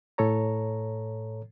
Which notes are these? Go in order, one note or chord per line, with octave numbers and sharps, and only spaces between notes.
A2 A4 C#5 A#5